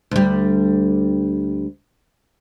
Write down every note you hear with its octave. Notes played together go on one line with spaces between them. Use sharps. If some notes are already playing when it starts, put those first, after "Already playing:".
D2 G3